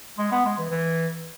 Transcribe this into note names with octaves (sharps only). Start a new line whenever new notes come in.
G#3
B3
G#3
E3
E3